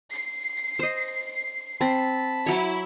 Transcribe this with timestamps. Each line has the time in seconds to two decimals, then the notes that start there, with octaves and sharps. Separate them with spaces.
0.13 C7
0.79 C5 D#5
1.81 C4 A5 B5
2.47 F#3 E4 C#5